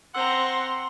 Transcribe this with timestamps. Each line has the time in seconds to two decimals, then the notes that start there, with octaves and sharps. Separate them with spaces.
0.15 C4 F#5 A#5 C6 E6